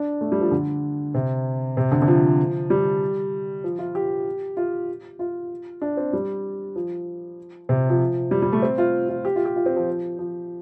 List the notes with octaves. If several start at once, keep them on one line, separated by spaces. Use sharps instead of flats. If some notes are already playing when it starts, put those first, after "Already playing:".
Already playing: D4
A3
G3
F3
D3
C3
C3
D3
D3
F3
G3
F3
F4
G4
F4
F4
D4
C4
G3
F3
C3
F3
G3
G3
A3
C4
F4
F4
G4
F4
G4
F4
C4
F3
F3